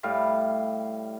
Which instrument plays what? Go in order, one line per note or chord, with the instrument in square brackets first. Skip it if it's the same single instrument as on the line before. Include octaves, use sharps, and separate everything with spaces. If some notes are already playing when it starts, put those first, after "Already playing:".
[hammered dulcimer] A2 G3 F5